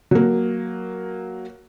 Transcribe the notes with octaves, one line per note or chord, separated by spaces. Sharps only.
F#3 A#3